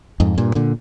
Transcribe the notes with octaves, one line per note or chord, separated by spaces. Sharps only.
F2 G#2
G2 A#2
A#2 D3